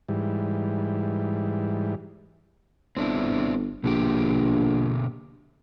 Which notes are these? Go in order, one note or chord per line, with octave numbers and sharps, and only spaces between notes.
G#2 E3 G3
G1 C4 D4 E4
A#1 B2 D3 G4